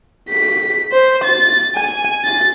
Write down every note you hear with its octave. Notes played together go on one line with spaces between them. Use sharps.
B6
C5
A6
G#5
A6